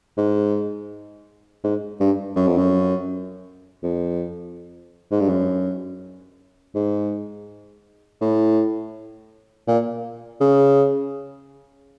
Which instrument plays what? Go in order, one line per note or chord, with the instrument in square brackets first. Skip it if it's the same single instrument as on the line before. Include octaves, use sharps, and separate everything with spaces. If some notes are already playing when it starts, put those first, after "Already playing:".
[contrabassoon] G#2
G#2
G2
F#2
F2
F#2
F2
G#2
G2
F#2
G#2
A2
A#2
C#3